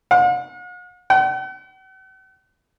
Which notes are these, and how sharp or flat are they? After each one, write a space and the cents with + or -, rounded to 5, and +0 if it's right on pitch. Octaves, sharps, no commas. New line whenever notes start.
F#5 -45
F#5 +45